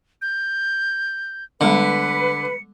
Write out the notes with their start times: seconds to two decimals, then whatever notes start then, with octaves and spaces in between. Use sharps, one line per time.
0.22 G6
1.61 D3 G3 G#3 B3 B4 C#7